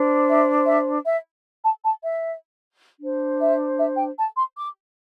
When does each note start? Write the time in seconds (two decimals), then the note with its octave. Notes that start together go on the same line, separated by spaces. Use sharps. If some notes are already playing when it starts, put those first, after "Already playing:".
Already playing: D4 C5
0.28 E5
0.66 E5
1.05 E5
1.63 A5
1.83 A5
2.02 E5
3.00 D4 C5
3.39 E5
3.78 E5
3.97 G5
4.17 A5
4.36 C6
4.56 D6